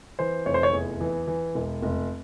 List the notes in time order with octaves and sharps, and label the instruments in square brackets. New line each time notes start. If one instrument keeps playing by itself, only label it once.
[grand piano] E3 C5
F1 C#5
C5
C#5
E2
E3
E3
E1
F1